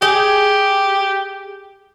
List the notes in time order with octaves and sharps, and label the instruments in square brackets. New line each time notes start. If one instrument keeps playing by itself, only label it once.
[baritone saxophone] G4 [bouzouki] G#4